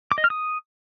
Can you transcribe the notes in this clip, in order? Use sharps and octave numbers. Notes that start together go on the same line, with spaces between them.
D6
D#5
F6
D#6